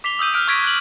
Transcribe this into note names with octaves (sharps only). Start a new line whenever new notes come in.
D6 B6 C7 F7 G7
D#6 E6 G6 D#7
F6 F#6 B6 D7
C#6 D#6 G#6 A#6 B6 D7
F#6 B6 D7 F#7